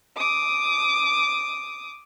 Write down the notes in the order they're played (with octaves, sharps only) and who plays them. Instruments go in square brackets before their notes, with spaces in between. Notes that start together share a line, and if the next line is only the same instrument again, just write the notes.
[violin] D6 D#6